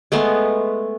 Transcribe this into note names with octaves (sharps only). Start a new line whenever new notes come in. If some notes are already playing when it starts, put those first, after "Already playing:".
G#3 A3 B3